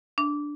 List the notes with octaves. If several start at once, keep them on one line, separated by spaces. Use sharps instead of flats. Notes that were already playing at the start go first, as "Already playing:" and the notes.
D4